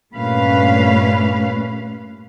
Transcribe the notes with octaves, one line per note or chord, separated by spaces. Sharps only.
G2 A#2 A3 C#4 B4 F5